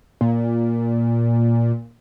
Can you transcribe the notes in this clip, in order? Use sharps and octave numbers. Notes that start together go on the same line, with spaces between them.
A#2